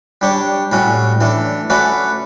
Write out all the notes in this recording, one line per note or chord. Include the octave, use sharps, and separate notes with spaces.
G3 D4 G4 C#5
A2 G3 C#4 F#4
E3 A3 D4
A3 C#4 F#4 B4 D5